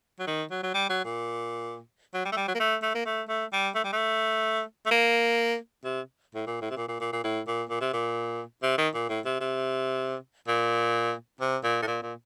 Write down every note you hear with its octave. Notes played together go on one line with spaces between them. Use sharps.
F#3
D#3
F#3
F#3
G3
F#3
A#2
F#3
G3
A3
G3
F#3
A#3
A3
A3
A#3
A3
A3
G3
A3
G3
A3
A3
A#3
C3
A2
A#2
A2
C3
A#2
A#2
A#2
A#2
A2
A#2
A#2
C3
A#2
C3
D#3
A#2
A2
C3
C3
A#2
C3
A#2
A2
A#2
A#2